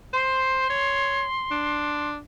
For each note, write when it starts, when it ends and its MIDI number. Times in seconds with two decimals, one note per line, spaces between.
0.13 0.66 72
0.13 2.10 84
0.70 1.24 73
1.51 2.19 62